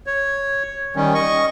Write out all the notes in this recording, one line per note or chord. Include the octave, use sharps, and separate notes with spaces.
C#5
D#3 G3 C#4
D#5 C#6